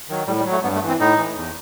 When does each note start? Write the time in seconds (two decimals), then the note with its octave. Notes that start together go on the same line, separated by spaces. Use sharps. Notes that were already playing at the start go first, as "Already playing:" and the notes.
0.09 D#3 F#3
0.27 A2 G3
0.39 G3
0.45 F#3
0.52 A3
0.63 G2 B3
0.76 A3
0.82 E3
0.88 C4
1.00 A2 D#4
1.18 E3
1.36 E2